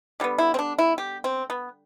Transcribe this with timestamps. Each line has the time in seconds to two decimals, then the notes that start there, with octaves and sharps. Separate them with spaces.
0.20 D3 G3 B3
0.38 E4
0.54 C4
0.59 D4
0.78 E4
0.98 G4
1.24 C4
1.50 B3